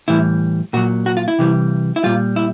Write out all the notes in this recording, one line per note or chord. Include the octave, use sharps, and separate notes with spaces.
A2 E3 G3 E4
A#2 F#3 F#4
F#4
F4
E4
C3 E3 G3
E4
A#2 G3 F4
E4